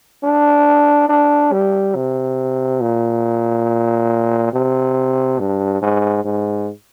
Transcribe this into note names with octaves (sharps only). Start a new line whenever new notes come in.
D4
D4
G3
C3
A#2
C3
G2
G#2
G#2